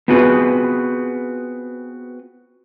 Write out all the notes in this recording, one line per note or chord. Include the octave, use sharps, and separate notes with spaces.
B3 C4 F4 F#4 G#4 B4